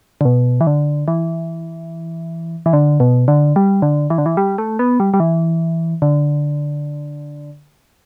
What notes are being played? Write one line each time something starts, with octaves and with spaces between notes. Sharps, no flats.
D3
B2
E3
D3
E3
E3
D3
B2
D3
G3
D3
E3
D3
E3
G3
A3
B3
G3
G3
E3
D3